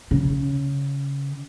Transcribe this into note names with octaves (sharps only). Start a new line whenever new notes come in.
C#3